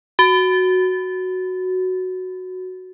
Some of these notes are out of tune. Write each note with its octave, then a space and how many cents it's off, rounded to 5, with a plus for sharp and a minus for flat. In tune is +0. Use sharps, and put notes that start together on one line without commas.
F#4 +0